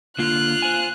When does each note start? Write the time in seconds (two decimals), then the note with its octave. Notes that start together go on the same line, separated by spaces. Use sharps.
0.19 D3 A#3 F4 F#6
0.62 C5 G#5